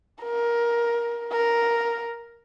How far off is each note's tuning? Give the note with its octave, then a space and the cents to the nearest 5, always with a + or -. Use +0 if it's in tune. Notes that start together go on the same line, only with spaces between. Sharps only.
A#4 +15
A#4 +5